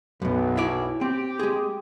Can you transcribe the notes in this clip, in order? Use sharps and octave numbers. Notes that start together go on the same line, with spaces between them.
B1 F#2 B2
E4 C#5 D5
C4 G4
G#3 G#4